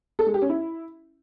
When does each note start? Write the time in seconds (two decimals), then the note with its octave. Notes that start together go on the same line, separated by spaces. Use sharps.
0.19 A4
0.26 G#3
0.34 G4
0.42 C#4
0.49 E4